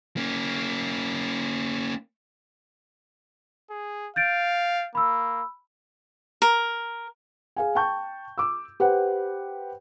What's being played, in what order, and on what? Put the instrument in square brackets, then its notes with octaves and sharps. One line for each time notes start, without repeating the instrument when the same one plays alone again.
[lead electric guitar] A#3 C#4
[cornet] G#4
[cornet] F5 [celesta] G6 A6 D7
[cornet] A#3 [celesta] B5 E6
[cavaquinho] A#4
[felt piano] G#4 F5 G#5
G5 A5 C#6 G6
D6 E6
G4 B4 C5 F#5